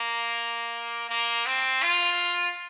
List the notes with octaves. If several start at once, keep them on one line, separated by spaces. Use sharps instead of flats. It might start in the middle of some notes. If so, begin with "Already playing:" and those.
Already playing: A#3
A#3
C4
F4